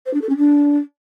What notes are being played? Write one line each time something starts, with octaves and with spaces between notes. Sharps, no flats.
C5
D4
A4
C#4
D4